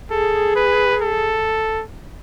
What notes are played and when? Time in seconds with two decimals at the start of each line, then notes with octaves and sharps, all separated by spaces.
0.11 G#4 A4
0.56 B4
1.01 A4